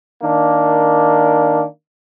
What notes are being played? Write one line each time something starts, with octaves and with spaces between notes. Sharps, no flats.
D#3 A#3 D4